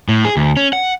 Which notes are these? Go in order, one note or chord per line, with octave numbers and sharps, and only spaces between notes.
A2
G#4
D2
C#4
F#5